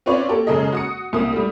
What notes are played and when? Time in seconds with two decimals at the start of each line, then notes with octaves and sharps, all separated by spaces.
0.06 C4 C#4 F4 B4 C#5 D5
0.29 A#3 G4 A4
0.47 F#2 C#3 G#3 G#4 A4 D#5
0.72 F#4 D#6 C#7
1.13 C2 A#3 D#6
1.32 G3 A3